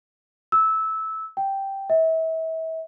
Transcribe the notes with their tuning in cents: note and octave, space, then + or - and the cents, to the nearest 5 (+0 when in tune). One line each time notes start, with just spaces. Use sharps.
E6 -15
G5 -5
E5 -35